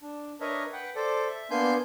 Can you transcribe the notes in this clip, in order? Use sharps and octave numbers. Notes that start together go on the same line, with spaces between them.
D4
D4 A#4 B4 C#5 D#5 E5
B4 F#5 G5
A4 C5 D5
E5
A#3 B3 D4 G#5 C6 G6